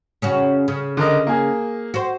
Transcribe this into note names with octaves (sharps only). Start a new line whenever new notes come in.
C#3 C#4 F#4
C#3
D3 A#4 D#5
A#3 G#4
F#4 C5